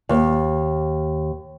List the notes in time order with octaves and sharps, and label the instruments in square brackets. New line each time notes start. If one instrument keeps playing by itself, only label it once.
[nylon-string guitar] D#2